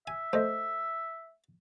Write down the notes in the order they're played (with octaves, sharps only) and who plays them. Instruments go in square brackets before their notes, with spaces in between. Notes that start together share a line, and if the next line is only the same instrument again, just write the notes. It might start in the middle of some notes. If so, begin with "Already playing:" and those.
[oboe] E5 [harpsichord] G#5
[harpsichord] A3 [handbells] C5 D#5